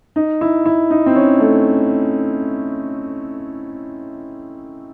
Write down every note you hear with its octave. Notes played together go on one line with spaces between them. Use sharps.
D#4
E4
E4
D#4
C4
C#4
A3